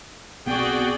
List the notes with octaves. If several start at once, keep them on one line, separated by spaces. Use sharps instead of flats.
B1 B3 C4 F#4 G#4 D5 G5